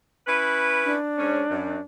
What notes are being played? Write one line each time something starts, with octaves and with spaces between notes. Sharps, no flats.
C#4 E4 B4
D4
G#2 C#4
F#2